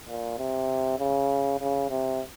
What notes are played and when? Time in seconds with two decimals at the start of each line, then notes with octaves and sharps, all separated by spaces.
0.08 A#2
0.38 C3
0.99 C#3
1.60 C#3
1.90 C3